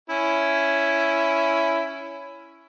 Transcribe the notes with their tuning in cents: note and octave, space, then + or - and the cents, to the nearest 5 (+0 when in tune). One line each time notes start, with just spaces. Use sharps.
C#4 +10 E4 +10